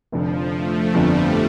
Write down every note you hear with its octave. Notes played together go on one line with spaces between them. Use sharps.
F1 F2 D3 F3
A3
G1 F2 D3 G3